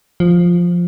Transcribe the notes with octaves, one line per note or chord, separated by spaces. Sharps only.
F3